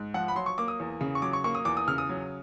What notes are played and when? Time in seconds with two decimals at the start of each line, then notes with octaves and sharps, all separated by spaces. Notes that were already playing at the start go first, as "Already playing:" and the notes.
Already playing: G#2
0.14 F3 F#5
0.28 B5
0.35 F#3 C6
0.46 C#6
0.58 A#3 D6
0.68 D#6
0.80 E2
1.01 C#3
1.15 C#6
1.22 F#3 D6
1.33 C#6
1.44 A#3 C#6
1.55 D#6
1.65 E2 D6
1.77 D#6
1.88 C#3 F6
1.98 D#6
2.09 F#3